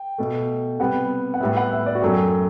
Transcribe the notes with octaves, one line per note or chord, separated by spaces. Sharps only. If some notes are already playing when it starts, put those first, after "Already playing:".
Already playing: G5
B2 A3
C3 G3 B3 F#5
F#5
A2 G3 B3 E5
F#5
E5
D5
F#4
F#2 F#3 A3 G4